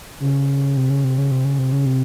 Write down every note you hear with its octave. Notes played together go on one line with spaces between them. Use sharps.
C#3
C3
C#3
C3
C#3
C3
C#3
C3
C#3
C3